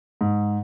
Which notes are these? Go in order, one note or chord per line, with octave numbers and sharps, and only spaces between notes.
G#2